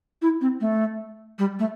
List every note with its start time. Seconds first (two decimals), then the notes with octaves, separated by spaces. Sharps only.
0.22 E4
0.41 C4
0.61 A3
1.39 G3
1.59 A3